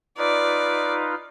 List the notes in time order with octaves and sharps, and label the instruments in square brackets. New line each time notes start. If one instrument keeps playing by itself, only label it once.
[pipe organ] D#4 F4 B4 [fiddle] D5